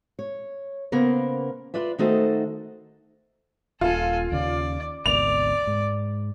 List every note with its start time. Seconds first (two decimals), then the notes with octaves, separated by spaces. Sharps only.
0.19 C#5
0.92 C#3 A#3 B3 A#4 C5
1.74 F4 B4 D5 E5
1.98 D#3 A3 D#4 F#4 A4 C5
3.81 D#1 F4 A4 G#5
4.32 D#2 C#3 D5
5.06 G#1 D2 B2 D5 F7
5.67 G#2